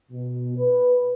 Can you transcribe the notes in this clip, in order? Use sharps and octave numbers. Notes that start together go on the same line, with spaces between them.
B2
B4